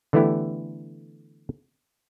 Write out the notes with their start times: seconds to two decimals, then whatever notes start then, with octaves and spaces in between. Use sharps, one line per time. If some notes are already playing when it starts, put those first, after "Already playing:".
0.13 D3 E3 A3 B3 E4 G4